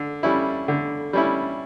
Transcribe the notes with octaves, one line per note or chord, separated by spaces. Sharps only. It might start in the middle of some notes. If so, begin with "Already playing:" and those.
Already playing: D3
G3 C#4 E4
D3
G3 C#4 E4